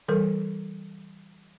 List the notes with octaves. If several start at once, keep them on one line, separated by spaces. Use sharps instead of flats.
E3 G3 A4 A#4